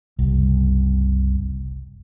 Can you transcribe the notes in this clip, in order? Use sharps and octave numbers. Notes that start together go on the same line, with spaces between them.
F#1 C2